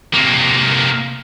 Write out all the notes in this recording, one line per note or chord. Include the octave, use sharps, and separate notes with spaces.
C3 A#3